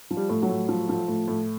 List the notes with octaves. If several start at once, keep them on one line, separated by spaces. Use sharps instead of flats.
F3
G3
A2
F#3
A2
F3
F3
A2
A2